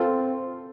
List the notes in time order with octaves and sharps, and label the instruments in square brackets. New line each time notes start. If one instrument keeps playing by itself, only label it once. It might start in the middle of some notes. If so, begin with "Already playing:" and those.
Already playing: [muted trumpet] C4 [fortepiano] F4 A4